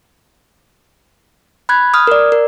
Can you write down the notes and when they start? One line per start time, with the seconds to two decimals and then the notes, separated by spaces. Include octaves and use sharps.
1.69 B5 F#6 G#6
1.94 D#6 F6
2.07 A#4 D5
2.32 A#4